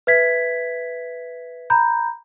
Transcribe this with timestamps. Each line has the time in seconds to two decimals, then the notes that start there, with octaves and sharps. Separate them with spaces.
0.07 B4 E5 G#6 B6
1.70 A#5 B5 G6